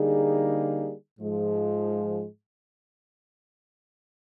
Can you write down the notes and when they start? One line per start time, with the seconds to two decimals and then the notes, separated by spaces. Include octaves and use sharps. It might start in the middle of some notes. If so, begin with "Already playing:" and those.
Already playing: D3 G3 A#3 D#4 G#4
1.20 G#2 F3 G#3